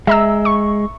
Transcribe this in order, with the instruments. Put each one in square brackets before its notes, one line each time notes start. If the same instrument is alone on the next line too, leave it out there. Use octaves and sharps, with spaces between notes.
[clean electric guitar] G#3 [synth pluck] E5 A#5 E6
[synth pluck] C#6